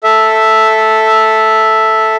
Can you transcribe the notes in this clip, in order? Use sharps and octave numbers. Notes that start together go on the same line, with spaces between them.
A4 E5